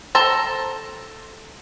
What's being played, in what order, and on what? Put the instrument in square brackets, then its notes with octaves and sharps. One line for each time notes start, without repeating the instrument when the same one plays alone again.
[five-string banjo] A4 C5 A5 A#5